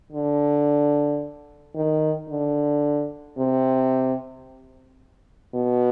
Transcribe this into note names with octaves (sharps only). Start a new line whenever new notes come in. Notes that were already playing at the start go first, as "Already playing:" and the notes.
D3
D#3
D3
C3
B2